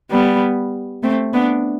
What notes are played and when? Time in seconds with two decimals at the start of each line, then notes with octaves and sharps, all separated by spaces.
0.11 G3 B3
1.03 A3 C4
1.34 B3 D4